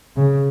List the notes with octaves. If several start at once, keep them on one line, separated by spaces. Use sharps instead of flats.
C#3